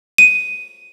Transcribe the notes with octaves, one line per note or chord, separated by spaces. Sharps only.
D#7